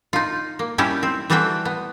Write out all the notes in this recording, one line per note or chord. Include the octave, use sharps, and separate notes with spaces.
D#4 F4
A#3
G3 C#4 D#4 E4 G4
C4
E3 G3 A3 C4 F#4 G5
B3